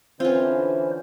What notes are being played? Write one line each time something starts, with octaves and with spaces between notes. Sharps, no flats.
D3 E3 C4 C#4 F4 C5